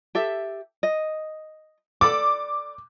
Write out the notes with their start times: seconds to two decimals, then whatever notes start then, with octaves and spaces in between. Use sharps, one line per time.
0.15 G4 A4 E5
0.83 D#5
2.01 A4 D5 B5 D6